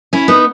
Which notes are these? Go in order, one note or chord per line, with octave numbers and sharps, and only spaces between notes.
C#4 E4
B3 D#4